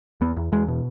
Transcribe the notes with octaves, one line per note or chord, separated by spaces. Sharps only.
E2 B3
E2
E2 G#3
B2